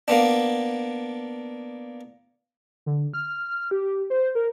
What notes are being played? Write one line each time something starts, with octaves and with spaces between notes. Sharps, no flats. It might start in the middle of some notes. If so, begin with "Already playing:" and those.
A#3 B3 D4
D3
F6
G4
C5
A#4